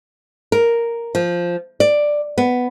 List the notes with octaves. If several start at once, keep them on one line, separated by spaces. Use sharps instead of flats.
A#4
F3
D5
B3